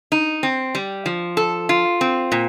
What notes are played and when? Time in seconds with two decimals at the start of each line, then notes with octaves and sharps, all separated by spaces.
0.12 D#4
0.43 C4
0.75 G3
1.06 F3
1.37 A4
1.69 F4
2.01 C4
2.32 A#2